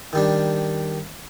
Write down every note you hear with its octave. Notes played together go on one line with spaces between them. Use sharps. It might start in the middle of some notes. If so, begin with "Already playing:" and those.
D#3 G3 D4